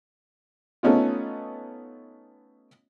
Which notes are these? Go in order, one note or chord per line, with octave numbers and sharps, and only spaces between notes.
A3 B3 C#4 D#4 F4